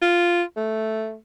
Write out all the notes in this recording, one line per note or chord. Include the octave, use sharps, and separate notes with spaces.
F4
A3